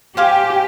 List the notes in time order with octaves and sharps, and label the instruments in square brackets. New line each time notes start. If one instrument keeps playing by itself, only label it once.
[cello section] G4 [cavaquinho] C5 F5 G#5 D6